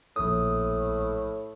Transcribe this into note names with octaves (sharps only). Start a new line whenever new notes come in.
A#1 A2 D#6